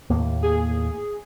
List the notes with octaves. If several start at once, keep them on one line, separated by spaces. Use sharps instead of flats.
D#2 A2 A#3
G#4